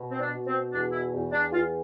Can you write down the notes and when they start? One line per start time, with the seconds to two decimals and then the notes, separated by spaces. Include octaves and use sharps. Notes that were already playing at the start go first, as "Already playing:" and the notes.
Already playing: B2
0.11 C4
0.20 D4
0.33 B2
0.47 C4
0.73 E2 D4
0.92 E4
1.14 E2
1.32 D4
1.52 E2 F4